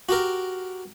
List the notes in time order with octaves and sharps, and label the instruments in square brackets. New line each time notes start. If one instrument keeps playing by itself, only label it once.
[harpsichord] F#4 G4 A#4